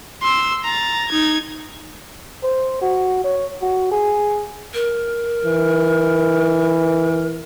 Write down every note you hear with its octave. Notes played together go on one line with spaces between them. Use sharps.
C6 E6
A#5 A6
D#4 G#6
C5
F#4
C#5
F#4
G#4
A#4
E3